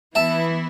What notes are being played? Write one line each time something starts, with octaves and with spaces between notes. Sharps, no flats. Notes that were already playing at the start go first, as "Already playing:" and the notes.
E3 B3 E4 E5 A5